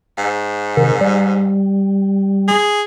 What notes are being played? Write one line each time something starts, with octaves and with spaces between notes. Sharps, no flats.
G#2
C3 D#3
G3
G#4